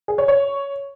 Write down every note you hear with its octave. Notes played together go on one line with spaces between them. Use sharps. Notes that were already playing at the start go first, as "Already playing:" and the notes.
G#4
C#5
C#5